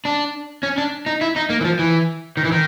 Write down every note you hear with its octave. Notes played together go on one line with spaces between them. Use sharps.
D4
C#4
D4
D#4
E4
D#4
A#3
E3
F3
E3
D#3
E3
D#3